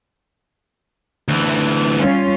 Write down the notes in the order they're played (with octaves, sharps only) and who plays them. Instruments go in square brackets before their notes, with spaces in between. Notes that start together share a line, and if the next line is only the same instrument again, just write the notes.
[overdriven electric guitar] D2 E3
[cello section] G3 C#4 F4